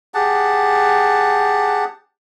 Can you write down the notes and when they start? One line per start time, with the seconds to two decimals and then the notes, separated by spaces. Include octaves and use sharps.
0.14 G4 G#4 F#5 A5